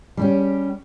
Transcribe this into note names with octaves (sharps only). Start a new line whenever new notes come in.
G3 C#4 G4